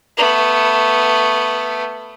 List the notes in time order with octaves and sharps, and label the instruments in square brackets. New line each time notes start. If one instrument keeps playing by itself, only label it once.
[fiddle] A3 B3